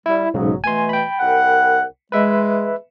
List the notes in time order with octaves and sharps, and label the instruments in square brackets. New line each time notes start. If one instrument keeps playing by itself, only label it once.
[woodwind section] G3 [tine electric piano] E4
[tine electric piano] B1 G#2 C#3 [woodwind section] F#3 B3
[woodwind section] B2 E3 A3 [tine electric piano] G#5 C6
[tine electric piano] G5 B5
[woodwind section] C2 A#4 F#5
[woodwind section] G#3 [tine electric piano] B4 E5